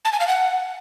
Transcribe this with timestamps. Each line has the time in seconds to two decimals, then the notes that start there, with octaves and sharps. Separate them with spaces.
0.05 A5
0.12 G#5
0.20 F5
0.28 F#5